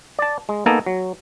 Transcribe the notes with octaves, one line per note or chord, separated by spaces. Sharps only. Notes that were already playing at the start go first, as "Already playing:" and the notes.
D5 A5
G#3
A#3 B3 D#4 A4 G#5 A#5
F#3